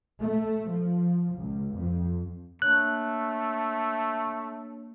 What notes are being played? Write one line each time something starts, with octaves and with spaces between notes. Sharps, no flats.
A3
F3
C#2
F2
A3 A#3 D4 C#5 F#6